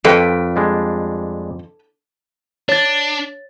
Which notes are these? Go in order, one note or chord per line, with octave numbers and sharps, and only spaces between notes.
F2 A4 B4 G5
G3 G#3 D4
D4 C#5 A6